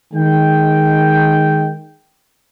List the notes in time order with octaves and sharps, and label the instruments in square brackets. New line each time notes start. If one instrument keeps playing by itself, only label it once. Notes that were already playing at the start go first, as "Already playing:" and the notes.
[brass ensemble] D#3 G#3 G5